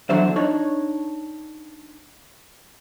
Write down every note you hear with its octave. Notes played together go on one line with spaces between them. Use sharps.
E2 D3 F#3 D4 C5 E5
D4 D#4 C#5